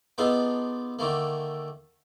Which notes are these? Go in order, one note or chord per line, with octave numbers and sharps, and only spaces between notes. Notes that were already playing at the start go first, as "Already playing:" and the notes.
B3 D4 D#4 F4 G#4 A4
D3 D#3 A3 A#3